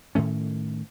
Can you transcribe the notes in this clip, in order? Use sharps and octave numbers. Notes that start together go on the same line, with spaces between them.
A2 D#3 A3 C#4